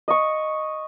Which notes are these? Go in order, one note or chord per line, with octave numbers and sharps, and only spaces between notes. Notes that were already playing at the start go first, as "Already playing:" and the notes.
D#5 C#6